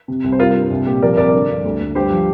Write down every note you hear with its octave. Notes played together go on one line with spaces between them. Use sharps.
C3
C2
C5
G3 F4 A#4
G2
C2
A#2 G4
F3 A#4 D5
C2 A#4 D5
D3
G2
D2
D2
G2 G4 C5
F3